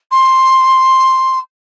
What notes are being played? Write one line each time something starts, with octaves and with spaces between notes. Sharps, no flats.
C6